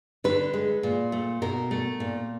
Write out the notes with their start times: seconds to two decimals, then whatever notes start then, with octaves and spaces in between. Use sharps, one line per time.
0.24 D3 B4
0.54 G#3
0.83 A#2
1.12 A3
1.42 B2 A#4
1.71 A3
2.00 A#2